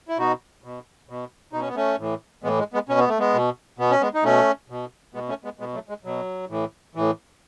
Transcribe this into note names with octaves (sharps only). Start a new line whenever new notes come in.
E4
B2 D#4 F#4
B2
B2
B2 D#4
C#4
B3
A3 C#4
A2 E3
A2 E3 G#3 B3
G#3
G#3 B3
B2 C#4
B3
A3
G#3 B3
B2
B2 B3
C#4
G#3 B3
D#4
B2 A3 C#4
B2
B2 G#3 B3
A3 C#4
G#3 B3
B2 G#3 B3
F#3 A3
G#3
B2 F#3
A2 E3
A2 E3